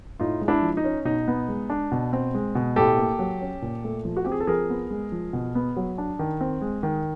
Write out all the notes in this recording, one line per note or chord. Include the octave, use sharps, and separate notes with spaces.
A2 D#4 F4
G#3
D4 E4
F3
D#4
C#4
B2 D#4
B3
G#3
D4
B2
C4
G#3
B2
A2 G4 A4
A#3
F#3
C#4
A#2
A3
F3
F#4
C4 G4
G#4
A4
F3 G#4 A#4
B3
G#3
F3
B2
B3
F#3
D4
D#3
C4
G#3
D#3